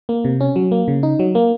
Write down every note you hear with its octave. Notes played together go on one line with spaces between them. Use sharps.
A#3
C3
C#4
F#3
A#3
C#3
D#4
F#3
A#3